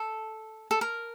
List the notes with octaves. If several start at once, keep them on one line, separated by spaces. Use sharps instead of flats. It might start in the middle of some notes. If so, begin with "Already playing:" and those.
Already playing: A4
A4
A#4